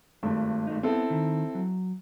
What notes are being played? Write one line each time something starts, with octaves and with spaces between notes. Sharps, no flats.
G#1 G2 A3
A3 D#4
B3 C4 E4 A4
D#3
F#3